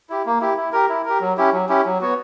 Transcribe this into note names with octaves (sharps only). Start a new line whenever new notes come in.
E4 G4
A#3
E4 G4
E4
G4 A#4
E4
G4 A#4
F#3
C#4 E4 G4
F#3
C#4 E4 G4
F#3
B3 F#4 C#5